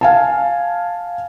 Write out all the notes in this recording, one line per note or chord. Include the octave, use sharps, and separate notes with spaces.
F5 G#5 A5